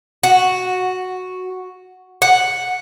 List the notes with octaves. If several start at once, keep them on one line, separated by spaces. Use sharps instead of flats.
F#4
F#5